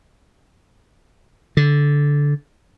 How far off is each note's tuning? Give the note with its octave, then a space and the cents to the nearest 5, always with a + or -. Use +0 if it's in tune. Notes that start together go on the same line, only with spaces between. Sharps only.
D3 -15